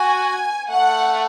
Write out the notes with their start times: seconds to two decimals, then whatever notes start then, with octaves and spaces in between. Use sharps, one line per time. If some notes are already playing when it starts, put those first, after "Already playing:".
Already playing: F#4 G#5
0.70 A3 F#5